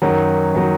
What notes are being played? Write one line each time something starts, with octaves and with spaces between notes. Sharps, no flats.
F#2 D#3 F#3
D#3 F#3